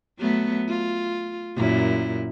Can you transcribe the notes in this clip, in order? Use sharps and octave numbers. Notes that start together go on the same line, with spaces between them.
F#3 A3 B3
F4
F#2 A#2 E4